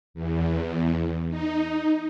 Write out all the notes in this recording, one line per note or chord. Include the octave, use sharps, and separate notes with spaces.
E2
D#4